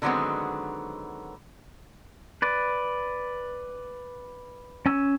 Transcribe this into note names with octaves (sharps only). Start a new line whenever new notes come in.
D3 D#3 F#3 G#3 B3 C4
B4 D5
C#4 G#5 E6